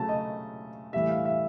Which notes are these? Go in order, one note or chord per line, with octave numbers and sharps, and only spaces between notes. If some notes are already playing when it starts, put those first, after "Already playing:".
Already playing: C#3 F#3 A3 A5
D#5
A2 E3 G3 E5
F5
E5